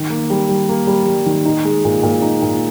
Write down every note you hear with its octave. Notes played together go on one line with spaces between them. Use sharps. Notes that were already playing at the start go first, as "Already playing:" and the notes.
Already playing: D#3
A#3
G3
G3
A#3
G3
G3
D#3
D#4
G#3
A#2
A#2
D#4
A#2